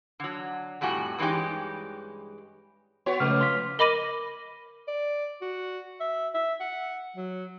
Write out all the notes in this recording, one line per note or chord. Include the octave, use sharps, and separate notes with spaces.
D3 F#3
F2 A2 G3 F#4 G#5
G2 E3 G#3 C#4 D#4 G4
B3 F#4 C#5
C#3 F3 G#3 A3 B4 D6 F6
F4 C6 B6
A#4 D#5 B5 D6 A#6 D#7
D5
F#4
E5
E5
F#5
F#3